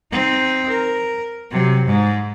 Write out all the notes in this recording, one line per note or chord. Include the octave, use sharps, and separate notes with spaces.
C4 D#4
A#4
C3 F#3
G#2